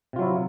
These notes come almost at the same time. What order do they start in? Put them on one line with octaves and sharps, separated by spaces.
C3 F4 F#3 E4